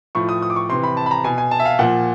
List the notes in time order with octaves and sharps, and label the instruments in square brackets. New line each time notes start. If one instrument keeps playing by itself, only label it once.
[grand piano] A2 F3 C#6
D#6
D#6
D6
C#6
C3 E3 C6
B5
A5
B5
A#5
B2 G#5
G#5
A5
E5
F5
A#2 F3 F#5